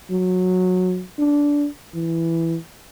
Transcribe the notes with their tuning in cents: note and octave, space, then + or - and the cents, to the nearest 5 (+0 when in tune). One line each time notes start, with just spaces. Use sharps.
F#3 -15
D4 -15
E3 +5